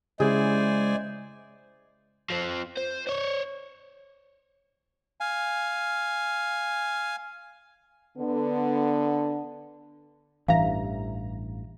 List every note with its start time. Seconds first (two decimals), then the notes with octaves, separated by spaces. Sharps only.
0.20 C#3 G#3 E4 G#4 C5 D5 G#5
2.30 F3 C4
2.77 C5
3.07 C5 C#5
5.20 F5 G#5
8.17 D3 B3
10.48 A1 G2 E3 E5 F5 A#5